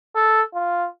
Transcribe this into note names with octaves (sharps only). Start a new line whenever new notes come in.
A4
F4